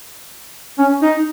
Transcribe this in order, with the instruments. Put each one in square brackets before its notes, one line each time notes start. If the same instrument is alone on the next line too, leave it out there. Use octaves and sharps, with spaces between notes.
[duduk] C#4
D#4